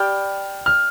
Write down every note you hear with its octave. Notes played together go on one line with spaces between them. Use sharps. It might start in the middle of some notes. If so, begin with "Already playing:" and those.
Already playing: G4 D5 G5 B5 F6
F6